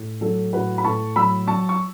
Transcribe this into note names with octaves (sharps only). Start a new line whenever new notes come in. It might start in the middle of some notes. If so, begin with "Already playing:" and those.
Already playing: A2
F#3 A4
A2 F#4 B4
B5
A2 A5 C#6
F#3 B5 E6
F#3 A5 C#6
C#6